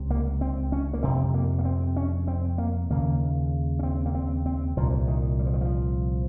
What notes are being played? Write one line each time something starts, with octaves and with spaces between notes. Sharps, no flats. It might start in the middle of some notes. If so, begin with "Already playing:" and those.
Already playing: C#2 C3
A#3
C4
C#4
A#3
F2 C3 C4
A#3
A#3
C4
C#4
C4
A#3
D#2 C#3 A#3
C#4
C4
A#3
C4
C4
C2 A#2 F3
D#3
G3
F3
D#3
F3